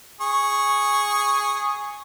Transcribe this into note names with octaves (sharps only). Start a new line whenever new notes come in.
G#4 C#6